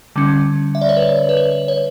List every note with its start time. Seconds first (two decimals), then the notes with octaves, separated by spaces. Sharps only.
0.16 D3 G3 C#4
0.75 E5
0.81 D5
0.89 C#5
0.97 B4
1.29 B4
1.37 C#5
1.68 C#5